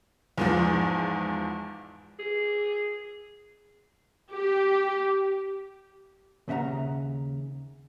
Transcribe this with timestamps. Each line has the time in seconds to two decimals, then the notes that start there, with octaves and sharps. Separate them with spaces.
0.38 E2 G#2 F3
2.19 G#4
4.33 G4
6.48 D#2 C#3 E5 F#5 A#5